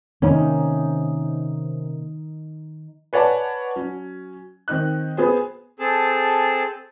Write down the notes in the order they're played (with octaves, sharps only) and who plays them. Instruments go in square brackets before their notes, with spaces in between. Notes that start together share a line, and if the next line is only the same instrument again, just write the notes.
[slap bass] C3 A#3 C4 [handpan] D#3 D#4 [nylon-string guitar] C#4
[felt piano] B4 C#5 D5 F#5 G#5 A5
F#3 C#4
D#3 C4 D#4 F#6
B3 G#4 C5
[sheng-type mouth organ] C4 G#4 A4 A5